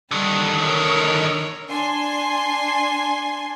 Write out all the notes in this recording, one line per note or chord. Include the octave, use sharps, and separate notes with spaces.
D3 D#3 G3
A#4 C#5
D4 G#5 C6